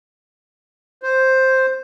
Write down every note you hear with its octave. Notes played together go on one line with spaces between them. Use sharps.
C5